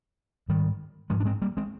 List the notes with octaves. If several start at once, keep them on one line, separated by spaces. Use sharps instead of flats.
G#2 D#3 G3
G#2 F3 G#3
D4
G#3 C4
G3 A#3
G#3 C4